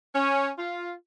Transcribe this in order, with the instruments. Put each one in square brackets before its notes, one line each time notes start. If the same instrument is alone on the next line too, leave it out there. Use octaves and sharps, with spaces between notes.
[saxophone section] C#4
F4